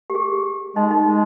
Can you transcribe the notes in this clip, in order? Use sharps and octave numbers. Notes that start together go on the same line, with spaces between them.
G4
G#4
G#3 D#4
D#4
G#3